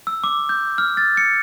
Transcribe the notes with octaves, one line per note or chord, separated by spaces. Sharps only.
E6
D6
G6
F6
A6
C#7